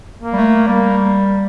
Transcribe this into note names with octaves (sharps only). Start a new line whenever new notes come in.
A#3
G3
A3
G3 A#3